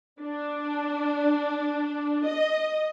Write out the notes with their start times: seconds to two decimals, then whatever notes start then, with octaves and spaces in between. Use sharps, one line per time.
0.21 D4
2.25 D#5